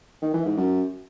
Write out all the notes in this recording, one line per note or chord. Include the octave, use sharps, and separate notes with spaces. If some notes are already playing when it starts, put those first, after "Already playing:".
D#3
E3
G#2
F#2